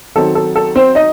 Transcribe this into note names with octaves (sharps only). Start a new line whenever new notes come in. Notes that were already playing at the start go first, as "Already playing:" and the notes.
D#3 F#3 C4 A4
A4
A4
C4 C5
D#4 D#5